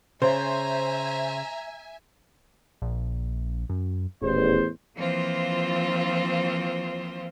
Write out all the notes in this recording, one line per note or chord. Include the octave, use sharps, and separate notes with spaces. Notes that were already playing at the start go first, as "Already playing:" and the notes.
C#3 C5 E5 G#5 A#5
A#1
F#2
D#1 A1 E2 C5
E3 F3 A#3 C4 F4 C5